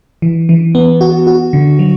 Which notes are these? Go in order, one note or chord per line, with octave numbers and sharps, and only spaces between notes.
E3
E3
B3
F#4
F#4
D3
F#3